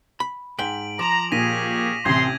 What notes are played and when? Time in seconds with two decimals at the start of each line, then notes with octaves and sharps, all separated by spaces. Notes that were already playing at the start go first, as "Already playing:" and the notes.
0.20 B5
0.59 G#2 G5 B6 D7 F#7
0.99 F3 A#5 D6 E7 F7
1.32 A#2 C#4 G4 G#4 A#6 B6 D#7
2.05 A1 C3 C6 G6 G#6 A#6